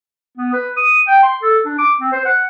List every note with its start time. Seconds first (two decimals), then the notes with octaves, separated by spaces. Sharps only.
0.38 B3
0.53 B4
0.77 D#6
1.08 G5
1.23 C6
1.42 A4
1.65 D4
1.78 D6
2.01 C4
2.12 C5
2.25 F#5